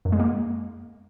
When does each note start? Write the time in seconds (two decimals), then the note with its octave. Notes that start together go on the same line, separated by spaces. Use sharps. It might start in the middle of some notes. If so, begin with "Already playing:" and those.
0.05 F#2
0.12 G#3
0.20 A#3